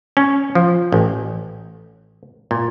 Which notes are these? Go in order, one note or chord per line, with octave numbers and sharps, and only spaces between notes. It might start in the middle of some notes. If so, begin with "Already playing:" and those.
C#4
F3
A1
A#2